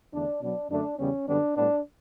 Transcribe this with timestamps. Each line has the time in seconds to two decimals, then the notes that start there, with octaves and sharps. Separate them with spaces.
0.13 E2 D3 A3 D4
0.42 B2 F#3 B3 D4
0.70 F#2 D3 A3 D4
0.99 E2 C#3 G3 B3 C#4
1.27 F#2 D3 G3 B3 D4
1.56 A2 G3 B3 D4